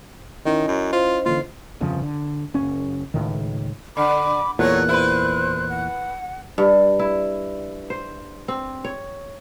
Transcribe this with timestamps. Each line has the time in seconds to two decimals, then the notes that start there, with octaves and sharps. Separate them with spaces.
0.46 D#3 C#4 E4 D#5
0.68 F#2
0.93 F4 C5
1.26 D3 E3 A#3 F4
1.81 G1 F2 C#3 F3
2.02 D3
2.54 F#1 C#4
3.14 C#2 A2 D#3
3.97 D3 B5 D6
4.59 E2 A#2 F#3 A3 C#5 F#6
4.89 E4 B4 C5
5.69 F#5
6.58 G2
6.99 E4
7.90 C5
8.48 C4
8.84 C#5